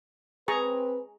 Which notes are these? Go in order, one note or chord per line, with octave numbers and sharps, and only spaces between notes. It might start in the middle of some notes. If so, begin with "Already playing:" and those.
C4 G#4 B4 A#5 C#6